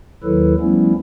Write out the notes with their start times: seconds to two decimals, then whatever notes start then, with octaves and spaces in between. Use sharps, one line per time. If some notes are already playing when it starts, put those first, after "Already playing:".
0.24 D#2 D#3 F#3 E4 A4 B4
0.60 F3 G3 A3 B3 C#4 E4